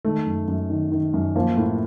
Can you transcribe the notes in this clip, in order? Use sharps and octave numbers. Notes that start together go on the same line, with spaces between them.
D#3 A3
F#2
F#2
D#3
D#3
F#2
F3 A#3
A2